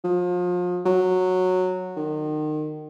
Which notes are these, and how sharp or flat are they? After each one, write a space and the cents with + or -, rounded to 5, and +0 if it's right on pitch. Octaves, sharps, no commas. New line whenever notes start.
F3 +35
F#3 -10
D#3 -30